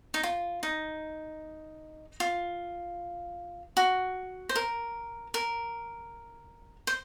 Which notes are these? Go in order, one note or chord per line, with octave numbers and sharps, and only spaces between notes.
D#4
F4
D#4
F4
F#4
C5
A#4
A#4
C5